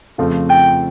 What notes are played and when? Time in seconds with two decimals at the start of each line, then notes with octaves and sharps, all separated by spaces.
0.18 F2 C#3 F3 A3 C4
0.50 G5